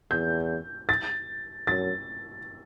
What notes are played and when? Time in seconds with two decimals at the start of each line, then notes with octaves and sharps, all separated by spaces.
0.11 E2 G6
0.89 A6
1.67 F#2 A6